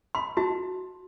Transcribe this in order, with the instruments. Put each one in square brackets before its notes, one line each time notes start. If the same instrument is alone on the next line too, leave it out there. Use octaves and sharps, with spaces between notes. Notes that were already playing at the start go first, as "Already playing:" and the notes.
[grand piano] B5 [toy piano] C6
[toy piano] F#4 [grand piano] A5